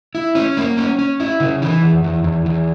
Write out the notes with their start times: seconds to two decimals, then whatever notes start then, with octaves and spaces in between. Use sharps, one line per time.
0.15 E4
0.35 C#4
0.57 A#3
0.77 C#4
0.99 C#4
1.20 E4
1.40 C#3
1.62 E3
1.82 E2
2.04 E2
2.24 E2
2.46 E2